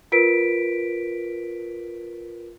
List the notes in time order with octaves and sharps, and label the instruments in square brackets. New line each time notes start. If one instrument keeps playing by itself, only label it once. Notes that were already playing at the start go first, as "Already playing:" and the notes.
[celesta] F4 A#4 B4 B6 D7